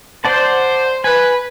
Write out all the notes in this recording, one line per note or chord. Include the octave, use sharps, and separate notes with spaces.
C5 D5 F#5 A5
B4 G#5